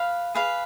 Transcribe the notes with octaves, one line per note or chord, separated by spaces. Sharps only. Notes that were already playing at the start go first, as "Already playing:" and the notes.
Already playing: B4 F5
G#4 B4 F5